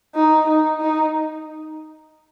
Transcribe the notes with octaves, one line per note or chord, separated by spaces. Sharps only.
D#4
D#4
D#4